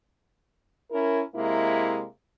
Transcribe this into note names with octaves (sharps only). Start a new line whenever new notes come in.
C#4 E4 A#4
C3 G#3 A#3 E4